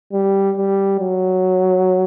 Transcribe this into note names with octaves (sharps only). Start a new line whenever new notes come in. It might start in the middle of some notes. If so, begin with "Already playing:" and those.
G3
G3
F#3